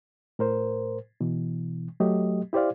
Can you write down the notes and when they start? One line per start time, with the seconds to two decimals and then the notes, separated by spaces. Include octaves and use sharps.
0.39 A2 A#4 C5
1.21 B2 E3
2.00 F#3 A3 G4 D#5
2.53 E4 G4 C5 D5 F5